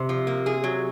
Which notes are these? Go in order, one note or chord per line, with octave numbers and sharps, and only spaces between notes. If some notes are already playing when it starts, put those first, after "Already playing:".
Already playing: C3
F3
A#3
G#4
F#3